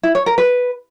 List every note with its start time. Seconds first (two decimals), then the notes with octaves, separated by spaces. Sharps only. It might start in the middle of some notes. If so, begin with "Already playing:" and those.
0.03 E4
0.15 C#5
0.26 A#4
0.38 B4